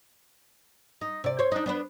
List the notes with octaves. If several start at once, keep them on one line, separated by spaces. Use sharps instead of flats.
D#4
C3 D5
C5 C#5
D4 D#4
B3 D4 B4